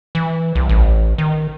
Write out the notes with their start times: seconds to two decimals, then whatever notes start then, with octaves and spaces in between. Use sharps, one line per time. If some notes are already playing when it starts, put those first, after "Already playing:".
0.15 E3
0.55 C2
0.69 A1
1.18 D#3